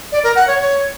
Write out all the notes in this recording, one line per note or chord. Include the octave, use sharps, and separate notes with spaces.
D5
A#4
F#5
C#5
C#5